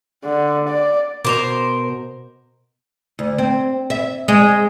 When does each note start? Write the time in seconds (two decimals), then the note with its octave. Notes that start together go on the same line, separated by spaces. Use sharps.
0.24 D3
0.69 D5
1.25 B2 A#4 C5 D6 F7
3.19 D2
3.38 C4
3.90 E5
4.28 G#3